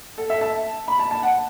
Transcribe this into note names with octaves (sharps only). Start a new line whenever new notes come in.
A4
E5
A5
B5
A5
A5
F#5